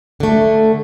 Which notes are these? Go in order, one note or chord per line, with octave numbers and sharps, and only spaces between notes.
D3 A3